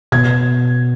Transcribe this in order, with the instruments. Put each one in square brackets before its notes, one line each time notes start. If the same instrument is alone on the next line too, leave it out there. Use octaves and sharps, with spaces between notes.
[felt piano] B2 G#6